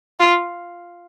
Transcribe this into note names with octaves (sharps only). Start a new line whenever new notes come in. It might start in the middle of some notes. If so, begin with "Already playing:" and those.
F4